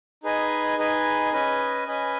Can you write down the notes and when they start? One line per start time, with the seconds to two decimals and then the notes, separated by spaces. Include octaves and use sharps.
0.23 D#4 G#4 B4 D#5 G#5
0.78 D#4 G#4 B4 D#5 G#5
1.33 C#4 B4 D#5 G#5
1.87 C#4 B4 D#5 G#5